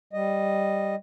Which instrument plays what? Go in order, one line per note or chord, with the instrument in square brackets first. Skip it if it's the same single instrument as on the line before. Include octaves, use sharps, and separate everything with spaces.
[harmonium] G3 D#5